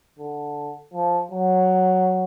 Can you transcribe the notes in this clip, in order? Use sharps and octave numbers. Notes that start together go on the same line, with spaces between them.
D3
F3
F#3